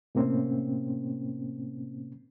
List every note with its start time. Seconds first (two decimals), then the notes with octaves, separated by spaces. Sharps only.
0.15 A2 C3 A#3 C4 C#4